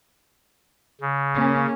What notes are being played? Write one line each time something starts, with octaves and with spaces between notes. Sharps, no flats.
C#3
A#3 C#4